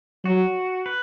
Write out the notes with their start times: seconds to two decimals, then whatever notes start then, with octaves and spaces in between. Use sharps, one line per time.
0.25 F#3 F#4
0.86 B4